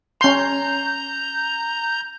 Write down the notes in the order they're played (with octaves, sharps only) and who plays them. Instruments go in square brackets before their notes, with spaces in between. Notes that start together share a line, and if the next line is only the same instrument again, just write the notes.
[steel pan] C#4 C6 [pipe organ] A#5 G6